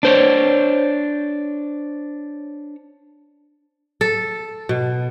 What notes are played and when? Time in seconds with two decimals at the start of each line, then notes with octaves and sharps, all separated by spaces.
0.03 D4 C5 C#5
4.01 A4
4.69 B2